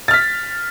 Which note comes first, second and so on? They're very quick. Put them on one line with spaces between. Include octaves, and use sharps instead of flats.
A6 F6 B6